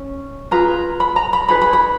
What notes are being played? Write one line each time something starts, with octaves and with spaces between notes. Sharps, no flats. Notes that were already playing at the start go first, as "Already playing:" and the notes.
Already playing: C#4
F4 G#4 B4 A#5
B5
A#5
B5
D#4 G#4 B4 B5
B5
B5